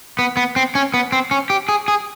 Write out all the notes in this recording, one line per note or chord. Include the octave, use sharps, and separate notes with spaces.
B3
B3
C4
C#4
B3
C4
C#4
G4
G#4
G#4